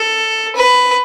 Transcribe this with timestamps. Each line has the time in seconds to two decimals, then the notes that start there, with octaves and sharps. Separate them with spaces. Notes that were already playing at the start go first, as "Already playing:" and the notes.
Already playing: A4
0.55 B4